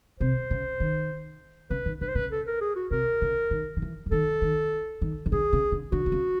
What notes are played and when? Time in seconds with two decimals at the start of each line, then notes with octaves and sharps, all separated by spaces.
0.20 C3 C5
0.51 C#3
0.80 D#3
1.70 C#3 B4
1.86 D#3
2.01 D3 B4
2.08 C5
2.15 C#3 B4
2.31 A4
2.47 A#4
2.61 G#4
2.76 F#4
2.91 C3 A#4
3.22 C#3
3.51 D#3
3.77 D#3
3.82 E3
4.06 E3
4.11 D#3 A4
4.42 D#3
5.02 D#3
5.26 D#3
5.32 D3 G#4
5.53 C#3
5.72 D3
5.92 D3 F#4
6.06 D3
6.12 C#3